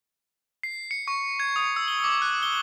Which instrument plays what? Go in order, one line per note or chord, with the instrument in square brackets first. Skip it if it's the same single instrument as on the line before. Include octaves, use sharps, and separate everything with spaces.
[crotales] C7
C#7
C#6
G#6
D#6
E6
G7
D6
F#6
G7